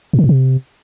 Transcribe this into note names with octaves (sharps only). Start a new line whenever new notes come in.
A2
D3
A2
C3